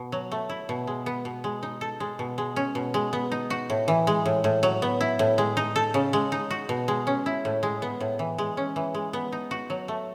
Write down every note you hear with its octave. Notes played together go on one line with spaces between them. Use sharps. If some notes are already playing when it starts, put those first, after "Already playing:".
Already playing: B2
F#3
A3
E4
B2
G#3
B3
B2
G#3
D#4
A4
G#3
B2
G#3
C#4
B2
G#3
B3
D#4
F#4
A2
E3
G#3
A2
A2
F#3
B3
E4
A2
G#3
D#4
A4
C#3
G#3
D#4
F#4
B2
G#3
C#4
E4
A2
G#3
B3
A2
E3
G#3
C#4
E3
G#3
B3
D#4
F#4
F#3
A3